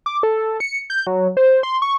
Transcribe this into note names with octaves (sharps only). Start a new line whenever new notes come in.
D6
A4
C#7
G6
F#3
C5
C6
C#6